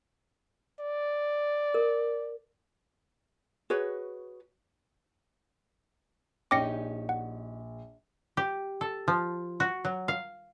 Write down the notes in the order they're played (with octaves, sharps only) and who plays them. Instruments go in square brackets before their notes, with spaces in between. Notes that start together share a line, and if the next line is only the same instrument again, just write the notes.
[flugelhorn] D5
[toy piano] A#4
[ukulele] F#4 G#4 B4 C#5
[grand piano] A#1 [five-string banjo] C#4 D#4 G4 [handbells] D6 A#6 C#7
[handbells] F#5
[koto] G4
A4
F3
F#4
F#3
F5